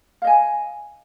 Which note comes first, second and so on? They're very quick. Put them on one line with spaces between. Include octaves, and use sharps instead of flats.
F5 D#5 G#5